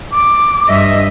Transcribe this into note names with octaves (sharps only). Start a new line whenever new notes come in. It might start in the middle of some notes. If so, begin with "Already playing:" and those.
D6
G2 D#5 E5